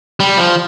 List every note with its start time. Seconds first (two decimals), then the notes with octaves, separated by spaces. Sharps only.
0.20 G3
0.37 F3